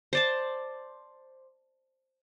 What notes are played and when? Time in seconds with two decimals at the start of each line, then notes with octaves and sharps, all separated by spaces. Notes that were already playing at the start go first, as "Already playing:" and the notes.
0.13 C5 D5 A5